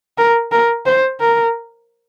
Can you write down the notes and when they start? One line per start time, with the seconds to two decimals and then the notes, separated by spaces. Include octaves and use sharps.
0.18 A#4
0.52 A#4
0.86 C5
1.20 A#4